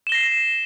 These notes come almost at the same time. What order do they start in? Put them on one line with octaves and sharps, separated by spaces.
E7 G7 A#6 C7